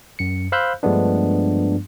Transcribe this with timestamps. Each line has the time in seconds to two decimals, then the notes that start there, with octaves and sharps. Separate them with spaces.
0.19 F#2 C#7
0.52 C5 F5 B5 E6 F#6 G6
0.83 G2 F3 G#3 A3 B3 D4